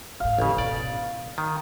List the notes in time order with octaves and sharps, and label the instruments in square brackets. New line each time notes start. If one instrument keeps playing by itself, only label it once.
[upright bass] G#1 G#2 [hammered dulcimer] F5
[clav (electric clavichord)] A1 C#3
[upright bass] B2 [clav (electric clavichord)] D5
[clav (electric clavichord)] D#3